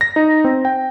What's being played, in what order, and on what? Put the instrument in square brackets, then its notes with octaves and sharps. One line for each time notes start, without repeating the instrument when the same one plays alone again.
[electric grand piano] A#6
D#4
C4
G5